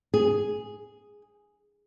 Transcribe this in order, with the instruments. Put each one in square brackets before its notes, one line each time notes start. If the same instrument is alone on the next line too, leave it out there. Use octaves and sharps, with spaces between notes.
[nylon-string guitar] G#4